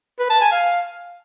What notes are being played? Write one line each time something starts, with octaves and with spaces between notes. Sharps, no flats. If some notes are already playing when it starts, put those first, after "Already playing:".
B4
A5
G#5
F5